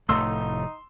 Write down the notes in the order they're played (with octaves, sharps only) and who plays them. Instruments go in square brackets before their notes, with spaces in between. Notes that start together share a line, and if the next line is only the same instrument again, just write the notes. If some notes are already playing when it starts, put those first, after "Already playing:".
[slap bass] F1 A2 A3 [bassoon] D#4 [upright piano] C6 E6